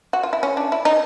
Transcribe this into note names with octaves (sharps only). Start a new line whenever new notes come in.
F#4
F4
E4
C#4
D4
E4
D#4